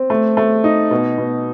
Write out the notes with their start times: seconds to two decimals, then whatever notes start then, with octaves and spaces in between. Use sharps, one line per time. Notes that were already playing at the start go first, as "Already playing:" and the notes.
Already playing: C4
0.10 A3
0.37 A3
0.64 D#4
0.91 B2
1.18 B2